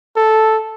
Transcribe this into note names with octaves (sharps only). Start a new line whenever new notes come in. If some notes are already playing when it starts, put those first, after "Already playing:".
A4